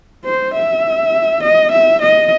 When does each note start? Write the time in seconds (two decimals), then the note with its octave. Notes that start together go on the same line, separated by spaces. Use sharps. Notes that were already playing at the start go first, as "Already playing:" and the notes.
0.25 C5
0.54 E5
1.43 D#5
1.71 E5
2.02 D#5